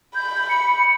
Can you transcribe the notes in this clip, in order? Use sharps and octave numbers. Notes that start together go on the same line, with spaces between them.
B5 G6
C#7